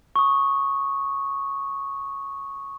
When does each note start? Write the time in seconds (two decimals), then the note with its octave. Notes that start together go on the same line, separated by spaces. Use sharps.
0.16 C#6 D#6